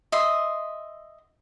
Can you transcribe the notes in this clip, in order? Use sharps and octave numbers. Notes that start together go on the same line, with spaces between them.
D#5 E5 C6